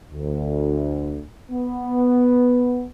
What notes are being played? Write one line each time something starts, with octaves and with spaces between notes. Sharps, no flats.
D2
B3